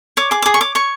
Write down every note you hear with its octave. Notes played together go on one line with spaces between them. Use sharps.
C#5 D6
G#4 D6
D6
G#4 D#6
C#6
C#5 D6
C#5 C#6